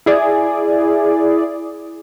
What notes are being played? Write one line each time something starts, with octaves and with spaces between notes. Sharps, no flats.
E4 G#4 D5